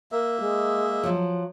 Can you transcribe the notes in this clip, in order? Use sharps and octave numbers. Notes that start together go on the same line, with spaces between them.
A#3 A#4 E5
G#3
F3 F#3